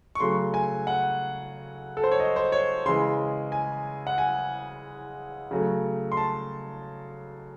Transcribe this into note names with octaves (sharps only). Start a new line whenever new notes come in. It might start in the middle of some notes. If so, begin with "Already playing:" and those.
C#6
C#3 F#3 A3 C6
G#5
F#5
A4
C5
C#5
D#5
C5
C#5
C#3 E3 G#3 C6
G#5
F#5
G#5
C#3 F#3 A3
C6
A5